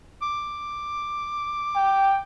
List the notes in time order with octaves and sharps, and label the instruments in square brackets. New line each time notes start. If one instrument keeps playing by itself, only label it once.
[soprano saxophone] D6
[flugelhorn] G5